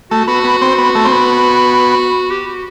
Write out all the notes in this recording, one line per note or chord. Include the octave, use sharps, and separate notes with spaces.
A3 F#4
B3 F#4
B3
C4
B3
A3
C4
B3
G4
F#4